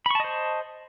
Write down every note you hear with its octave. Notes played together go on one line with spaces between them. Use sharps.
C5 D#5 A5 B5 C#6